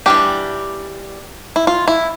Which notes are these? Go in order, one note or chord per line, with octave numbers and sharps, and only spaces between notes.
E3 G3 D4 G4
E4
F4
E4